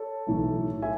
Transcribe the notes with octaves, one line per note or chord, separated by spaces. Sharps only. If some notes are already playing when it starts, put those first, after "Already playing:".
Already playing: A4 C#5
B1 A2 E3 A3
E5 G#5